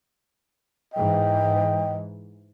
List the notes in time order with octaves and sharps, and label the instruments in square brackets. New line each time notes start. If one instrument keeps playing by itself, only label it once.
[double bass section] G#2 E3 [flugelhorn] D#5 [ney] G5